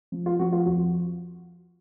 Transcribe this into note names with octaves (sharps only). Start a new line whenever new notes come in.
F3
F4
F3 F#4
F4
F2 F#4